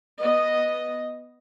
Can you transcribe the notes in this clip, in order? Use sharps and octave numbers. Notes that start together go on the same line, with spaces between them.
B3 D#5